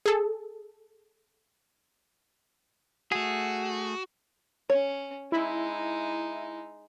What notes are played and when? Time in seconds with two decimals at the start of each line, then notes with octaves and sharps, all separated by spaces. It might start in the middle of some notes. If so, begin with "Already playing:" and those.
0.06 G#4 A4
3.12 A3 F#4 G#4
4.70 C#4 C#5
5.32 G#3 D#4 E4